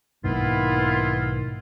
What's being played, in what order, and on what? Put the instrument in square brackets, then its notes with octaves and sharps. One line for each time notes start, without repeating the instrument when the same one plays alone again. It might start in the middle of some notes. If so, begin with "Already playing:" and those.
[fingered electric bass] B1 G#2 A#3 [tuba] D#3 [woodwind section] B3 E4 F4